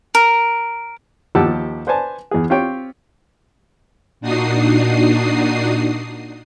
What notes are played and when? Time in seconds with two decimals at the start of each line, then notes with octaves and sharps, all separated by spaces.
0.15 A#4
1.35 D#2 F3 G4 F#5 A5 E6
1.87 B4 C5 D5 G#5 A5
2.31 E2 G#4
2.50 C4 F4 G4 C5 C#5 G5
4.21 A#2 D4 D#4 F#4 D#6 C7